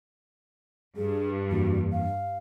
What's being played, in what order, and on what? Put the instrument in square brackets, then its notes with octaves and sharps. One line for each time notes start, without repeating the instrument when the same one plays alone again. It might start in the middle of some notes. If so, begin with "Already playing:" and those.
[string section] G2 [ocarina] G#4
[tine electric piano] F2 E3 A#3 [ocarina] F#4
[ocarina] F5